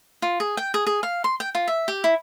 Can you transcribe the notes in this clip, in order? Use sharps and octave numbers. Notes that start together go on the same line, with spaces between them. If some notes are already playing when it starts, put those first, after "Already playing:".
F4
G#4
G5
G#4
G#4
F5
C6
G5
F4
E5
G4
E4